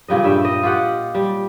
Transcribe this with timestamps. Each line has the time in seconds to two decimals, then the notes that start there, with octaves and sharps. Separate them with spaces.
0.08 A#2 C#3 G3 D#5
0.24 G2 G3 E5 G5
0.45 D#5
0.63 F4 G4 F#5
1.15 G3